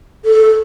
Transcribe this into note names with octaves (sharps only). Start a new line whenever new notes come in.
A4